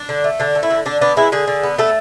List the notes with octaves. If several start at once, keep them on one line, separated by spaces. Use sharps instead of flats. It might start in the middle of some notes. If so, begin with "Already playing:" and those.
Already playing: D4
D3
A3
D3 D4
A3
E4
D3
D3 D4
B3 D4
G#3 E4
D3 G#4
D3
B3
A3 A4